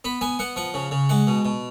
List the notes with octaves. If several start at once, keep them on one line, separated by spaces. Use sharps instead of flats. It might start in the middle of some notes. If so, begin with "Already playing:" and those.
B3 B5
B3 G#5
B3 F#5
F3 F#5
C#3
C#3
G#3 F#5
B2
B2